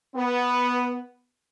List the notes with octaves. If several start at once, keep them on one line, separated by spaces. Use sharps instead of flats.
B3